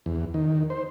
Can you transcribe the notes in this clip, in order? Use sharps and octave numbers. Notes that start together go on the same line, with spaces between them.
E2
D#3
C5